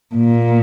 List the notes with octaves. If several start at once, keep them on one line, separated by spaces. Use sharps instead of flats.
A#2